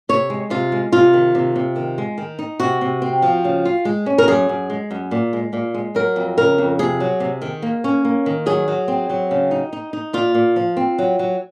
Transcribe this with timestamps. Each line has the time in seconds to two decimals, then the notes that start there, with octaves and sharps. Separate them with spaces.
0.09 C3 C#5
0.30 G#3
0.50 C3 F4
0.72 G#3
0.92 C3 F4
1.13 D#3
1.35 C3
1.56 C3
1.76 D#3
1.98 G#3
2.18 D#3
2.39 D#4
2.60 C3 F#4
2.81 C3
3.02 C4
3.22 F3
3.44 C#3
3.65 F4
3.85 G#3
4.06 C#4
4.18 A#4
4.28 F#2 G#4
4.49 F#2
4.70 G#3
4.91 F#2
5.11 A#2
5.33 G#3
5.53 A#2
5.74 G#3
5.95 F#3 A#4
6.16 F2
6.38 C#3 A#4
6.58 F2
6.79 C3 G#4
7.00 F#3
7.20 C3
7.42 D#3
7.62 A#3
7.84 C#4
8.05 A#3
8.26 D#3
8.46 F#3 G#4
8.68 F#3
8.88 C4
9.10 F#3
9.31 C#3
9.51 D#4
9.73 D#4
9.93 D#4
10.13 A#2 F4
10.34 A#2
10.56 F3
10.77 C4
10.98 F#3
11.19 F#3